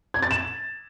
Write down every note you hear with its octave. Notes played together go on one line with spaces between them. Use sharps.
G#6
A6
E7